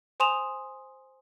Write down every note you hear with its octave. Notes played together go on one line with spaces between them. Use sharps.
C5 G#5 C6 D#6 E7 F7